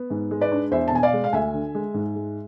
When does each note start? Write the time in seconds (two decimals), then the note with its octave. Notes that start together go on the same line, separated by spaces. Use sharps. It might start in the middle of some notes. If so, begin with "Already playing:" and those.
Already playing: B3
0.10 G#2
0.31 G#3
0.41 B4 D5
0.52 D4
0.71 E2 C5 E5
0.88 A5
0.92 B2 G#5
1.03 D5 F5
1.13 G#3
1.24 F5
1.33 D2 E5 G#5
1.54 D3
1.75 G#3
1.94 G#2
2.15 G#3